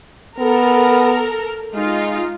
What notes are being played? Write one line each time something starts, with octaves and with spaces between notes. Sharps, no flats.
B3 A4 A#4 A#5
G#3 D#4 F4